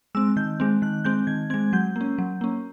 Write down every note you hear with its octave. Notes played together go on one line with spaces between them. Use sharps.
G#3 C4 E6
D#3 G6
G#3 C4
D#3 F#6
G#3 C4 G6
D#3 G#6
G#3 C4 G#6
F#3 G6
A#3 C#4
F#3
A#3 C#4